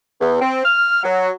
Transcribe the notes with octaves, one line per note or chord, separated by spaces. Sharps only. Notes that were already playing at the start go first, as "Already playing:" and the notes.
E2
C4
F6
F#3